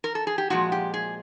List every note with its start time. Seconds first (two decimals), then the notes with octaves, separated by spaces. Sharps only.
0.04 A#4
0.15 A4
0.27 G#4
0.38 G4
0.50 A#2 F3 G#3 F#4
0.72 G4
0.94 G#4